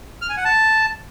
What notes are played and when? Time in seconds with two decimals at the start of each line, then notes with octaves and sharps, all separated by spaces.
0.22 F6
0.29 G#5
0.37 F#5
0.45 A5